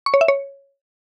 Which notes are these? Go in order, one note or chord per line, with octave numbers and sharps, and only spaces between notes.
C#6
C#5
E5
C#5